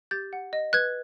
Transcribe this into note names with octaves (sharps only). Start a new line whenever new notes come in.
G4 G6 A6
F#5
D#5
B4 F#6 G#6